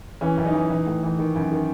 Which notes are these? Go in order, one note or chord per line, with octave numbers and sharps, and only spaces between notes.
E3 C#4
F#2
D#4
E3
E3
A2
E3
D#3
F#2
D#3